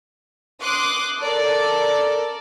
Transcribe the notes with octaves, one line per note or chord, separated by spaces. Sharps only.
C6 D6 D#6 F#6
A4 A#4 D5